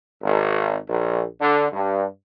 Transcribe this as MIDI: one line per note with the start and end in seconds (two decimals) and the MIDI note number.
0.23 0.76 32
0.89 1.24 34
1.40 1.66 50
1.72 2.05 43